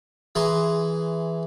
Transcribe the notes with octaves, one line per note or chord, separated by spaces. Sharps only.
E3 G#4 A#5 C6